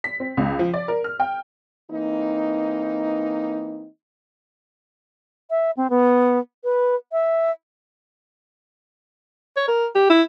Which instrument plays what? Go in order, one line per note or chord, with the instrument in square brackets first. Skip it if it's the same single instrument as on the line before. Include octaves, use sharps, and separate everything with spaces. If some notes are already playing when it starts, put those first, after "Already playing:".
[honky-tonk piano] B6
C4
C#2
F3
D5
A#4
F6
G5
[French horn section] E3 A#3 C4 D#4
[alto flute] E5
C4
B3
B4
E5
[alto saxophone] C#5
A#4
G4
E4